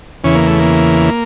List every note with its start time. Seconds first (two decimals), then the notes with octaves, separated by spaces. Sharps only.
0.24 E2 C#3 E3 C#4
0.35 A#3
0.47 A3
0.60 A#3